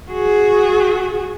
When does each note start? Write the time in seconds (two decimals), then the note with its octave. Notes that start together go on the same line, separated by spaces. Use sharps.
0.12 F#4 G#4